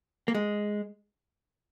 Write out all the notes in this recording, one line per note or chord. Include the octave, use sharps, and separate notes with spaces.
A#3
G#3